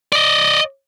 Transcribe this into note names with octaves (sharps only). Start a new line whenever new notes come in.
D5 D#5